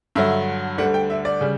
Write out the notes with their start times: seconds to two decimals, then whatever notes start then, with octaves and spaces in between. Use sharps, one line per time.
0.15 G2 D3 F#3 E5
0.78 D2 D3 G3 F#5
0.94 G5
1.10 E5
1.25 D5
1.41 C#3 G3